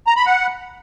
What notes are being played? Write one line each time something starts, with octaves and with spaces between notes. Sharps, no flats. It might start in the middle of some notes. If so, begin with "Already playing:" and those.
A#5
B5
F#5